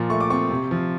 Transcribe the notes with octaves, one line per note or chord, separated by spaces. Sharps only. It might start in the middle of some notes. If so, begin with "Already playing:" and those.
Already playing: A#2 F3 C6
A3 C#6
D6
C4 C#6
C3
F3